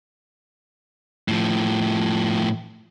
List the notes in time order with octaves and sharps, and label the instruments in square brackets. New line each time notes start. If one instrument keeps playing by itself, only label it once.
[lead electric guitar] A2 F3